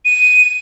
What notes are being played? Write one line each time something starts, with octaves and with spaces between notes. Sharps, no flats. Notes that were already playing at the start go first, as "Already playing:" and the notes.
D#7